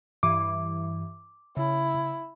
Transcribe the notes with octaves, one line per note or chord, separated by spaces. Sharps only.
G2 E3 D6
C#3 E4